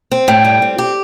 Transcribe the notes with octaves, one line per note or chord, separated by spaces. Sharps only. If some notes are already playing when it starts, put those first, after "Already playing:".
C4
A2 G5
G3
C4
G4